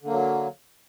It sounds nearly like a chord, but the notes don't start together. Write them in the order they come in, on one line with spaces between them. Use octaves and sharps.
D3 A#3 F#3